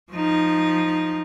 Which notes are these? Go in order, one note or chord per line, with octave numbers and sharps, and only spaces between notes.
F3 D#4